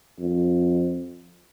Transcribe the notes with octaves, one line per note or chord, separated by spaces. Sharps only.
F2